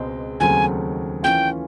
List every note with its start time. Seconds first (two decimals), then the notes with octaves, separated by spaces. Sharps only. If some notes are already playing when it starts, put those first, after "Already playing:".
Already playing: C#2 B2 G#3 C4
0.40 D#2 C#3 F#3 A3 C4 G#5
1.23 E3 A3 C#4 F4 G5